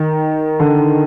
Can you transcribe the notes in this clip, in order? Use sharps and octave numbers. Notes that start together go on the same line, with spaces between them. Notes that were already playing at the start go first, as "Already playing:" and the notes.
Already playing: D#3
D3